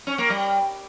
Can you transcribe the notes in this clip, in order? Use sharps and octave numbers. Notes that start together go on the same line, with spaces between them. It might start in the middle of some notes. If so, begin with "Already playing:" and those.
C#4
A#3
G3